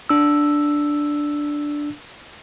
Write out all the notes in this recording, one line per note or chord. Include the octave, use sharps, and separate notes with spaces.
D4 E6